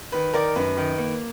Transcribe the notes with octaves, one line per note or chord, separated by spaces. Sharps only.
D#3 B4
D#3 A#4 D5
F#2 B4
D#3
A#3